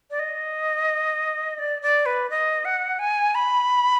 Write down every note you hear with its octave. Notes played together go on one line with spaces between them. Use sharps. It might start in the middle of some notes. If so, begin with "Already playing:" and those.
D5
D#5
D5
D5
B4
D#5
F#5
G#5
B5